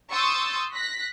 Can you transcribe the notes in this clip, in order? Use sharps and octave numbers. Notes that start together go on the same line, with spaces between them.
C6 C#6 D#6 E6 G6 A6
F#6 A#6 B6